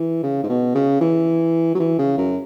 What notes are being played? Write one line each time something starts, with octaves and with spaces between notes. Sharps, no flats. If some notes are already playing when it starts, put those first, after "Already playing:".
Already playing: E3
C#3
G#2
B2
C#3
E3
F#3
E3
C#3
F#2